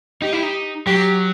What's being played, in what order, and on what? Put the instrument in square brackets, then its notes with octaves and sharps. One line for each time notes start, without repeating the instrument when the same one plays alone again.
[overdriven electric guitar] D#4 [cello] G4
[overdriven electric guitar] E4
D#4
[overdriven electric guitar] F#3 [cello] G4